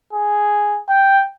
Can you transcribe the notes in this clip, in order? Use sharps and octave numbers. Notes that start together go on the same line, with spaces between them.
G#4
G5